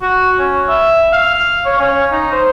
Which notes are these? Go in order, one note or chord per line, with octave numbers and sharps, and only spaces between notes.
F#4
C#4
E5
F5
C#5
C#4
D#4
C5